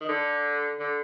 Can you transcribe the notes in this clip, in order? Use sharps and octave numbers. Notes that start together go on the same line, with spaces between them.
D#3
D3
D3